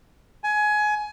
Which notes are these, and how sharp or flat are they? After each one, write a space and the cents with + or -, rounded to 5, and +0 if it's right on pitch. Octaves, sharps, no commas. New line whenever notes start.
G#5 +20